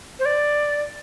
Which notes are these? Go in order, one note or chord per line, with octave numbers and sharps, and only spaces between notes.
C5
D5